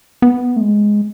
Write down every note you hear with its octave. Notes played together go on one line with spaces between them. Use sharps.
B3
A3
G#3